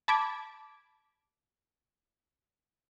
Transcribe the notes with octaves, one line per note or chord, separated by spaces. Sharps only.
A5 B5 D6 G#6